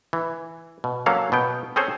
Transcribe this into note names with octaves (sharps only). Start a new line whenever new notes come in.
E3
B2
F#3 A#3 C#4 A4 F5
B2 B3 G5
C4 C#4 G#4 A4 C5 C#5